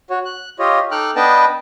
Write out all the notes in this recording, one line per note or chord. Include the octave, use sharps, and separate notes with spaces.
F#4 C#5
F#6
F4 G4 C#5 D#5
D#4 A4 G5 D6 F6 F#6
B3 D4 B4 D#5 G5 A5